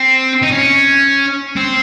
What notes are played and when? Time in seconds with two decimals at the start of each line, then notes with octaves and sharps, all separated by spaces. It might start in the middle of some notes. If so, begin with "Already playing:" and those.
Already playing: C4
0.43 D#4
0.52 C#4
1.57 C4